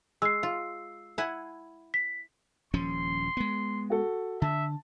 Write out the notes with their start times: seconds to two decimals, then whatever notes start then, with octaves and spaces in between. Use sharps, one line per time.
0.22 G#3 E6 C7
0.43 F4
1.18 E4 F#5 G#5
1.94 B6
2.74 D#1 F3 C#4 C6
3.37 G#3 B3
3.90 F#4 A4
4.42 D3 E5 A5